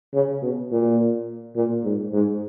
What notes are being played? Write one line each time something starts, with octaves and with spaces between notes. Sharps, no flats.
C#3
B2
A#2
A#2
G#2
G#2